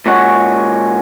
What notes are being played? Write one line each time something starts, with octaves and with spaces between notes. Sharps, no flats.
A#2 G#3 C#4 F#4